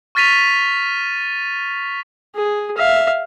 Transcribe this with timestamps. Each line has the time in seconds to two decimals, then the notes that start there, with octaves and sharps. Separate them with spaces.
0.15 C#6 F6 A6 B6 D#7 F7
2.35 G#4
2.77 E5 F5